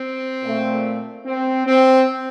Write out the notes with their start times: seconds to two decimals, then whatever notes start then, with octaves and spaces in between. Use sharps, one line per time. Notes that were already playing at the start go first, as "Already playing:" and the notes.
Already playing: C4
0.44 A#2 A3
1.26 C4
1.67 C4